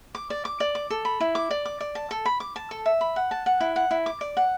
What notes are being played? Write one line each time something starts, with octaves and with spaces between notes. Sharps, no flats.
D6
D5
D6
D5
D6
A4
B5
E4
D6
D5
D6
D5
A5
A4
B5
D6
A5
A4
E5
B5
F#5
A5
F#5
E4
F#5
E4
D6
D5
F#5